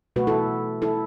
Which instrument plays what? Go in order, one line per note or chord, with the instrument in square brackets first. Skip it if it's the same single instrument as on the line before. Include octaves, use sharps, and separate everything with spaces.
[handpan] B2 A3 F#4 B4
E4 A4
E4 A4